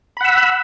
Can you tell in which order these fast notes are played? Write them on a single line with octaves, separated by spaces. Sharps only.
B5 F#5 E6